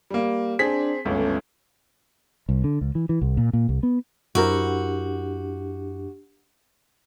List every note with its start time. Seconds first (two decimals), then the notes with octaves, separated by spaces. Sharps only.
0.10 G3 A#3
0.59 C4 D4 G#4 B6
1.05 G1 C#2 A3 C#4
2.49 C2
2.64 D3
2.81 C#2
2.95 E3
3.09 E3
3.22 C2
3.37 A#2
3.53 A#2
3.69 C2
3.83 B3
4.35 F#2 D4 E4 F#4 G4 A#4 C5